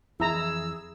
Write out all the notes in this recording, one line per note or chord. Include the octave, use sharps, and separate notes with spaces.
F2 E3 E4 G#4 A#5 E6